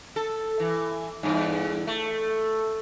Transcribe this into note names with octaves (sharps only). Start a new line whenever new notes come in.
A4
E3
E2 G2
A3